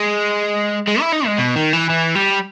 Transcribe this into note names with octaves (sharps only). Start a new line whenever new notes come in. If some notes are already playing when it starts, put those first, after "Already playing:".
Already playing: G#3
G#3
E4
D#4
G#3
B2
D#3
E3
E3
G3